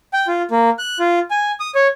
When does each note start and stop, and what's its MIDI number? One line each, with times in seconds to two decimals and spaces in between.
0.13 0.27 79
0.28 0.42 65
0.51 0.70 58
0.79 0.98 90
1.00 1.19 65
1.31 1.52 80
1.60 1.71 87
1.75 1.87 73